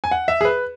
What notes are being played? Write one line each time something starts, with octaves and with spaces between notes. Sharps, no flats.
G#5
F#5
E5
G#4
B4